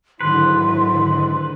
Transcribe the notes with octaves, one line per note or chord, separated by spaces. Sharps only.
G#2 D3 D#3 F#3 E4 B4 C6